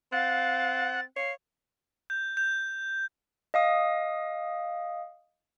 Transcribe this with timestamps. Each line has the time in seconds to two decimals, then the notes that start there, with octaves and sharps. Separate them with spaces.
0.12 C4 F5 F#5 A6
1.16 C#5 F5 C7
2.10 G6
2.37 G6
3.54 D#5 F5 D#6